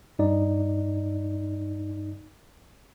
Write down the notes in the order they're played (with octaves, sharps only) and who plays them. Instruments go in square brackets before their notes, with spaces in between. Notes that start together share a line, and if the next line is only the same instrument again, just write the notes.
[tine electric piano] G2 D#4 D5